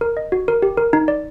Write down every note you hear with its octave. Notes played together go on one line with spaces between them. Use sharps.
A#4
D#5
F#4
A#4
G4
A#4
D#4
D5